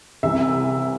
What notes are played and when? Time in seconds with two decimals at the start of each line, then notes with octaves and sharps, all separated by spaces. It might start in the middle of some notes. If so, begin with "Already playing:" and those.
0.23 C2 C3 E3 E5